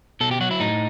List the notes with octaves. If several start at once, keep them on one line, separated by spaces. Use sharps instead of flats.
B2 A4
G4
F#3 F#4
E4
A2 D#4